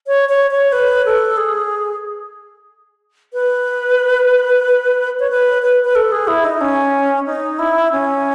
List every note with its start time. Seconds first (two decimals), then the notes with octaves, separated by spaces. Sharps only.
0.07 C#5
0.29 C#5
0.51 C#5
0.72 B4
1.05 A4
1.37 G#4
3.33 B4
5.19 C#5
5.30 B4
5.62 B4
5.84 B4
5.95 A4
6.12 G#4
6.27 E4
6.44 D#4
6.61 C#4
7.26 D#4
7.59 E4
7.92 C#4